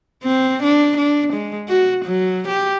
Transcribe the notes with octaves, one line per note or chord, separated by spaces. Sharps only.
C4
D4
D4
G#3
F#4
F#3
G4